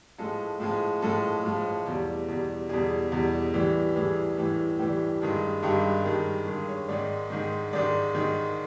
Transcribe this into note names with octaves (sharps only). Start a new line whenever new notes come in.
A2 F3 G#3 A4
A2 F3 G#3
A2 F3 G#3 A4
A2 F3 G#3
E2 B2 G3
E2 B2 G3
E2 B2 G3 G#4
E2 B2 G3
A2 E3 G3
A2 E3 G3 G#4
A2 E3 G3
A2 E3 G3 G4
G2 D#3 G#3
G2 D#3 G#3 G4
G2 D#3 G#3
G2 D#3 G#3 G#4
C#5
G#2 D#3 G#3 D5
G#2 D#3 G#3
G#2 D#3 G#3 D5
G#2 D#3 G#3